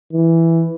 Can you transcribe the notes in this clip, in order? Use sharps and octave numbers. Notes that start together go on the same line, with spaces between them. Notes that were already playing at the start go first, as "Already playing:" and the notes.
E3